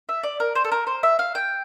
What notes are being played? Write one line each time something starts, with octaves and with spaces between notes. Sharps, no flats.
E5
D5
A#4
C5
A4
A#4
C5
E5
F5
G5